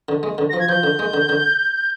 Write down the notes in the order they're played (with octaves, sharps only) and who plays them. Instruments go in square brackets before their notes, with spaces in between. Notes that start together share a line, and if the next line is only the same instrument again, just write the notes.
[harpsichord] D3
G#3
D3
[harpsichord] F3 [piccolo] A#6
[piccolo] G#6
[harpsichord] F3 [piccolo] G6
[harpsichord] D3
G#3
D3
D3